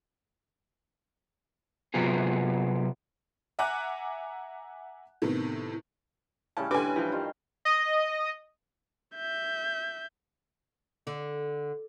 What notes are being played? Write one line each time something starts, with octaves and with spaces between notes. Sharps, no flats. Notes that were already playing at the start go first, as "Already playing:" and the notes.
C3 F#3 B3 C4 F4 G#4
E5 F#5 G#5 A#5 D6 F#6
A2 C3 D#3 B3
A2 C#3 G3 C#4 A5
D3 D4 G4 B4 G#5 A5 D6
E3 F3 G5
D#3 G3 F4
D#5
E5 G6
D3